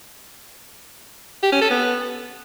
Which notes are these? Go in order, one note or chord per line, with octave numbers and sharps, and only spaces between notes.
G4
C#4
A4
B3